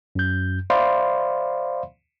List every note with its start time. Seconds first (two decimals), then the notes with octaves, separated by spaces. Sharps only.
0.15 F#2 G6
0.70 C5 D5 E5 F5 B5 C6